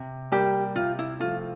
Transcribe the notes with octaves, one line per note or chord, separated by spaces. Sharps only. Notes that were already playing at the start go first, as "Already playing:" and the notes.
Already playing: C3
G3 A#3 G4
C3 F4
E4
F3 A3 F4